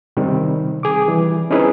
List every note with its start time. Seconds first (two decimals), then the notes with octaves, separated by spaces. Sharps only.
0.17 C3 D#3 G3 C4
0.83 G#4 D6
1.08 E3 G3
1.50 C4 C#4 D#4 E4 G#4 B4